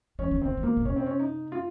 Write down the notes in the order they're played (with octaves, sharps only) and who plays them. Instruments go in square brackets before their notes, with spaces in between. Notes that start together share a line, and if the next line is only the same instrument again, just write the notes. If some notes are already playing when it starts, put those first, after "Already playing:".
[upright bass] F3 [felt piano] C#4
[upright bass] D#3
[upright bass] C#3 [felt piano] C4
[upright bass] D#3
[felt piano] A#3
[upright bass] A#2
[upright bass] C3 [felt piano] C#4
[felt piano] C4
C#4
D#4
F4